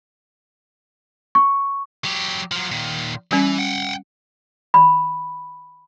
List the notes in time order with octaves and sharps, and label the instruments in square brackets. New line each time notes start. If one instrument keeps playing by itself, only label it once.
[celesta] C#6
[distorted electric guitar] F#3 G4
F3 F#3
A#2 D#3
[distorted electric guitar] E3 [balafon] G3 C#4
[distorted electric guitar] F#5 G5
[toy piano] B5